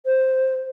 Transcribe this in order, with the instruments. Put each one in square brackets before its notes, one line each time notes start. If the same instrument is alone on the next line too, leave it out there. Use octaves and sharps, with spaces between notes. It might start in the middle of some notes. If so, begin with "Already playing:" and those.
[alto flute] C5